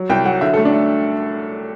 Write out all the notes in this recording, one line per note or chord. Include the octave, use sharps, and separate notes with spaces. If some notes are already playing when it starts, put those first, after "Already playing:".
Already playing: F#3
C2 G5
F#3 F#5
D3 E5
A4
A3
D4
A3